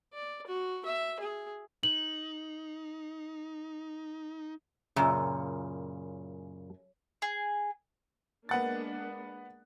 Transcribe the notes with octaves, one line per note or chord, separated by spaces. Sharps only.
D5
F#4
E5
G#4
D#4 F#7
F#2 A#2 C#3
G#4
G#3 A#3 B3 D4 F#5 A6